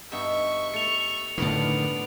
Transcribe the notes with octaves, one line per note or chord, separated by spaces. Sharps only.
G2 B3 D#4 E5 C#6
A3 C#7 F7
A2 D3 D#3 F3 B3 D4 A#4 B4